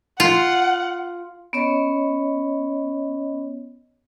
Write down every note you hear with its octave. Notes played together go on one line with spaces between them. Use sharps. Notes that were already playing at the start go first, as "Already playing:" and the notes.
F4 F#5
B3 C#4 C#5 D#5